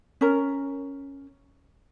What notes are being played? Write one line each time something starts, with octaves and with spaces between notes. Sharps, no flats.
C#4 A#4